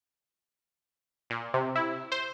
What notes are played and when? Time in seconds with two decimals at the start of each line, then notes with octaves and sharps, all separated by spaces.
1.30 A#2
1.54 C3
1.76 E4
2.12 C5